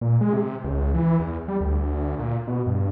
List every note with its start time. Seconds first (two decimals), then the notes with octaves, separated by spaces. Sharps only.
0.01 A#2
0.21 G#3
0.33 C3
0.64 C#2
0.94 E3
1.20 E2
1.48 G3
1.61 D2
2.19 A#2
2.47 B2
2.67 G2